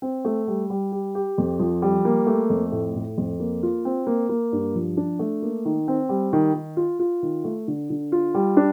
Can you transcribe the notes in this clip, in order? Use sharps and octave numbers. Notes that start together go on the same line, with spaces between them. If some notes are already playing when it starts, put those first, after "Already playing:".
C4
A3
G3
G3
G4
G4
F2
F3
G3
A#3
A3
F2
A2
A2
F2
A#3
F4
C4
A#3
A#3
G2
F3
D4
A3
A#3
D#3
C4
G3
D#3
D#3
F4
F4
D#3
A3
D3
D3
F4
G3
D4